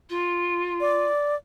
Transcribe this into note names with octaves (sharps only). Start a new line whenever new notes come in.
F4
D5